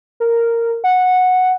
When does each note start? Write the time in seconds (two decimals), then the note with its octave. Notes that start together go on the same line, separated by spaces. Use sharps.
0.20 A#4
0.84 F#5